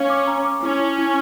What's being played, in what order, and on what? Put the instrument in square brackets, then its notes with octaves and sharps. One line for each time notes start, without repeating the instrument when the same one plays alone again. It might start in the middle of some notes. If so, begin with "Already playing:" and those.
Already playing: [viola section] C#4 [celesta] F5
[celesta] D6
A#5
D6
[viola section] C#4 [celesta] E4
[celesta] E4
E4